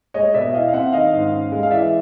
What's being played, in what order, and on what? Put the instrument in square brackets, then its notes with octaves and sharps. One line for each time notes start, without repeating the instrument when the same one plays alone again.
[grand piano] G#3 C#5 D#5
B2 D5 E5
E4 D#5 F5
F5
C4 E5 F#5
D#3 D#5 F5
G#2
C#4
G#3
F5
E3 D5 E5